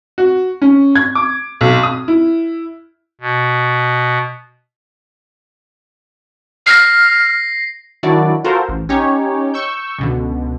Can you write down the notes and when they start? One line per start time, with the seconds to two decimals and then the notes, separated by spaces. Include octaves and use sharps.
0.18 F#4
0.62 C#4
0.95 G#6
1.15 D6
1.61 B1
1.83 D#6
2.08 E4
3.21 B2
6.67 F6 A#6 C7
8.03 D#3 F#3 D4 E4 F#4 D5
8.44 F4 F#4 A4 A#4 C5
8.68 A1
8.89 C#4 D#4 G4 C#5
9.54 C#6 E6 G6
9.98 C#2 B2 D3